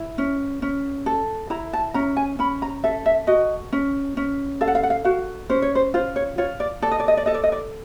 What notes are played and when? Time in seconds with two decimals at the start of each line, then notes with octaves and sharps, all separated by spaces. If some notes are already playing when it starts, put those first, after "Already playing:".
Already playing: E4
0.18 C#4
0.62 C#4
1.06 A4
1.50 E4 A#5
1.73 A5
1.94 C#4 A#5
2.17 G#5
2.39 C#4 B5
2.62 A#5
2.84 A4 E5
3.06 E5
3.27 F#4 D#5
3.73 C#4
4.17 C#4
4.61 A4 F5
4.68 F#5
4.75 F5
4.83 F#5
4.90 F5
5.05 F#4 F5
5.50 C#4 C5
5.62 C#5
5.75 C5
5.94 F4 C5
6.16 C#5
6.38 F4 C#5
6.60 D5
6.82 A4 D5
6.91 D#5
7.00 D5
7.08 D#5
7.17 D5
7.26 A4 D#5
7.34 D5
7.44 D#5
7.52 D5